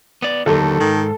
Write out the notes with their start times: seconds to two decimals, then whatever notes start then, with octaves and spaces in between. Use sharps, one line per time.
0.22 B3 D5
0.46 D#2 D3 F#3 A4
0.80 G#2 D#3